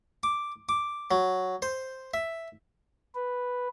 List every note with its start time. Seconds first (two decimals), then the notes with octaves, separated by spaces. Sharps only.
0.23 D6
0.69 D6
1.11 F#3
1.62 C5
2.14 E5
3.15 B4